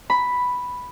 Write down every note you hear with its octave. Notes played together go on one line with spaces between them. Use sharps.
B5